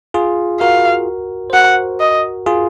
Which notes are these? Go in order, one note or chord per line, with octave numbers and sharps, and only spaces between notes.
F4 G#4
F#4 A#4 F5
C5
F#4 A#4 F#5
D#5
F4 G#4